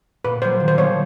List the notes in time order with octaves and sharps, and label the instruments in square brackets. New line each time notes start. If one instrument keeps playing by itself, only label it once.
[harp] A#2 [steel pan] B4
[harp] F#3 A#3 [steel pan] C5
[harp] D#3
[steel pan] C5
[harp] G3 B3 D4 F4 [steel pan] C#5